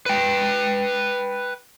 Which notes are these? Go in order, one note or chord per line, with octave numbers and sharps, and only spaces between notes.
B4 G5